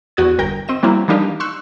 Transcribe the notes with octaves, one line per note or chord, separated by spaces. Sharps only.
E2 F#4 D5 D#6 G#6
G1 A#4 G5 G6
C4 D#5 E7
F#3 G3 A#3 C4 E4
E3 G3 A#3 D4 D#4 G4
C6 C#6 E6 F#6